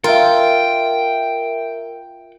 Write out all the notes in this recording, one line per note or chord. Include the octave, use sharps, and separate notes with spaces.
F4 A#4 E5 G5